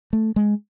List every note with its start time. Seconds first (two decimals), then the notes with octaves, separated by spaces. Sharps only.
0.13 A3
0.36 G#3